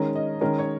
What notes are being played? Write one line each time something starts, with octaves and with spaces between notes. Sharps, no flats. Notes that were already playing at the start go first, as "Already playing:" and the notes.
Already playing: D#3 G#3 C#4 A#4
D#5
D#3 G#3 C#4 A#4
C#5